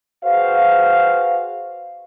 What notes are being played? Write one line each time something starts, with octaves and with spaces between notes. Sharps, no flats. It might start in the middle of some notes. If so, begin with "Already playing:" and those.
F#4 G#4 B4 C5 F5